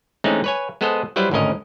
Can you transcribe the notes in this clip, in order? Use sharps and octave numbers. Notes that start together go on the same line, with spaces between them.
E3 G#3 A3 C4 C#4 D#4
B4 C#5 G#5
G#3 B3 G#4 A4 C5 D#5
F#3 G3 E4 B4 C5
G#1 D2 A2 C#4 A#4 D#5